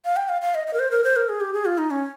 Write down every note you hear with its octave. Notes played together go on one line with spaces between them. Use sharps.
F5
G5
F5
F5
D#5
D#5
A#4
C5
A#4
C5
A#4
G#4
G4
G#4
F4
D#4
C#4